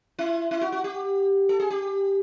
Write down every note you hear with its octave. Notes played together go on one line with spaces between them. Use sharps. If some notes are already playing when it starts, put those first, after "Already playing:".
E4
E4
F#4
F#4
G4
A4
G#4
G4